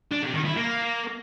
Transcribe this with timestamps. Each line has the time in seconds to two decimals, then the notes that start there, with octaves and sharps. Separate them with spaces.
0.11 D4
0.23 C3
0.34 D#3
0.45 E4
0.57 A#3